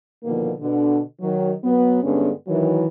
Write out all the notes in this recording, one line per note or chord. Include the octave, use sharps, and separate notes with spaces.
B2 D3 D#3 F3 A#3
B2 D3
D#3 F#3
F#3 B3
G2 D3 G#3 B3 C#4 D4
D#3 E3 F#3